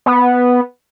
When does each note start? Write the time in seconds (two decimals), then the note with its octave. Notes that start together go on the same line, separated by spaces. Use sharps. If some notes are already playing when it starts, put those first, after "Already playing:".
0.06 B3